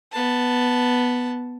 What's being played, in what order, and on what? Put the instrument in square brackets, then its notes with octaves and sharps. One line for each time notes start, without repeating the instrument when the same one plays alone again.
[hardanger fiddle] B3 A5